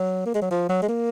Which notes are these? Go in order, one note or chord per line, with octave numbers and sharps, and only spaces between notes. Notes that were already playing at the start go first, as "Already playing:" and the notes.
Already playing: F#3
A#3
G#3
F#3
F3
F#3
G#3
A#3